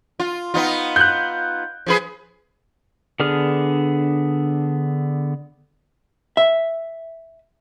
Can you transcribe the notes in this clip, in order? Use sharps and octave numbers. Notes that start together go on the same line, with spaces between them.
F4
B3 D#4 F4
F#6 G6
F3 G#4 B4
D3 B3 D4 G#4 F6
E5